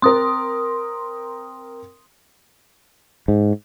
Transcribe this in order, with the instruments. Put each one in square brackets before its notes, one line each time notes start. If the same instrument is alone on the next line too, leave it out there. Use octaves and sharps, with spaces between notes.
[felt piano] C4 A#4 [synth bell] C6 D#6
[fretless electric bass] G#2